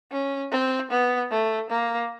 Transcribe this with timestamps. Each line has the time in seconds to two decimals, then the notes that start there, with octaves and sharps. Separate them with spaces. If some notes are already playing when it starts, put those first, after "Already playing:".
0.12 C#4
0.52 C4
0.91 B3
1.31 A3
1.70 A#3